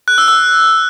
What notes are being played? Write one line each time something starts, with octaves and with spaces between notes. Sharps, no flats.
F#6
E6
E6